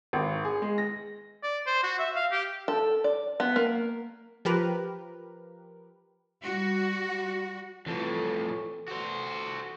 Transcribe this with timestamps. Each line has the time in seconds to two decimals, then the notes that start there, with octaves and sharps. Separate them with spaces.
0.13 G#1
0.45 G#4
0.62 G#3
0.78 A#6
1.43 D5
1.67 C5
1.83 F#4
1.99 E5
2.16 F5
2.32 G4
2.68 A4
3.04 D5
3.40 B3
3.56 A#3
4.45 F3 G4 A#4 B4
6.43 G3 F#4
7.86 F2 A2 E3 A4 B4
8.88 F#4 C5